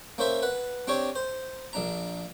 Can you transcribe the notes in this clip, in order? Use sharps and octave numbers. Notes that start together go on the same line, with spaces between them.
A#3 C#4 C5 E5
B4 F#5
C4 D4 G4 C#5
C5
A#1 D4 A#5